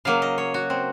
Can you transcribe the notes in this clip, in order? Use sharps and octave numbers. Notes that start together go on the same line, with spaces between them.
C#3 F#3 A#3 F5
D#5
C#5
F#4
C4